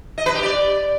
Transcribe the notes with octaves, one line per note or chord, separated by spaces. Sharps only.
D#5
B4
G4
D5